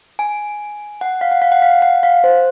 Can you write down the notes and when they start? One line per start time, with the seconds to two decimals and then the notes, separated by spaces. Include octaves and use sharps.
0.19 G#5
1.01 F#5
1.21 F5
1.32 F#5
1.42 F5
1.52 F#5
1.62 F5
1.82 F#5
2.03 F5
2.24 C5